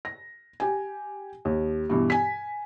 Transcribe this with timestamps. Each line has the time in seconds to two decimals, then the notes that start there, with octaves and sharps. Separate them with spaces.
0.05 A#6
0.60 G4 G#5
1.45 D#2
1.90 G2 B2 E3
2.10 G#5 B6